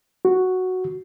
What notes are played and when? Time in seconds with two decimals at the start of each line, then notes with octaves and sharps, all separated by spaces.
0.25 F#4